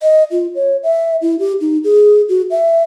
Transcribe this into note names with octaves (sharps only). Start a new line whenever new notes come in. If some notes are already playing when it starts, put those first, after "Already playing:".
D#5
F4
C#5
E5
E4
G4
D#4
G#4
F#4
E5